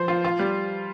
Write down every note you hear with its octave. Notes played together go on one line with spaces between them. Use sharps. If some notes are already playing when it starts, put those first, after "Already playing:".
Already playing: F3 C5
F4
F4
G3